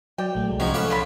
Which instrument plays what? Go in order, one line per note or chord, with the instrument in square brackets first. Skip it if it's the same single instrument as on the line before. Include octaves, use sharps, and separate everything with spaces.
[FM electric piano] F#3 D5 [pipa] G5
[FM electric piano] A#1 A3
C2 G#3
[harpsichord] G#2 C#3 F3 [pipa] F#3
[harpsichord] C#4 A4 B4 [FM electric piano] F5 F#5 D6
[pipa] C#3 F4 B5